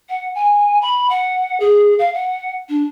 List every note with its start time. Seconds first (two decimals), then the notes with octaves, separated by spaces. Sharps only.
0.09 F#5
0.35 G#5
0.81 B5
1.09 F#5
1.60 G#4
1.99 F5
2.14 F#5
2.69 D4